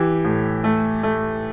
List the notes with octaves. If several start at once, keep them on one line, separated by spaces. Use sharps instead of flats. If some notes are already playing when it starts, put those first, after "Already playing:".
Already playing: E3 G4
A2
A3
A3